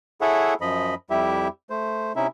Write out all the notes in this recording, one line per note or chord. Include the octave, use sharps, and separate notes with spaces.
E4 G#4 A4 C#5 E5 F#5
F#2 F3 D#5 B5
F2 G3 E4 G4 E5
A3 C5
C3 C#4 D#4 E4 E5